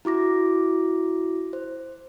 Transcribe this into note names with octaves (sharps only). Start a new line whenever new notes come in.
E4 F#4 D6 A#6
C5